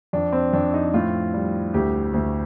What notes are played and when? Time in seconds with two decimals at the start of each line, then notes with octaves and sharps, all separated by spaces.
0.13 F2 D4
0.32 C4
0.53 F2 D4
0.74 D#4
0.94 A2 F4
1.34 G3
1.74 D2 G4
2.14 D2